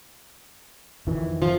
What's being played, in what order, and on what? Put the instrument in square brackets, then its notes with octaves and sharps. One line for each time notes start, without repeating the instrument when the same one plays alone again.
[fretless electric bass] F2 D#3 E3
[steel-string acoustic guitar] F3 F4